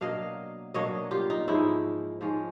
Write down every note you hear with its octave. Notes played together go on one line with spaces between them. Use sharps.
B2 F#3 A#3 D4 D#5 F5
B2 F#3 A#3 D4 C#5 D#5
F4 G4
D#4
G#2 F3 G#3 C#4 E4
G#2 F3 G#3 C#4